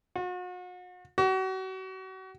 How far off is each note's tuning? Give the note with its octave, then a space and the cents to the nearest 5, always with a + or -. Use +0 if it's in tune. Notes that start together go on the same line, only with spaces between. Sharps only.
F#4 -40
F#4 +35